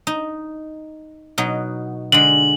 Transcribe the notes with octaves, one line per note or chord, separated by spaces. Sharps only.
D#4
B2 F#3 D#4
D3 G#3 F#7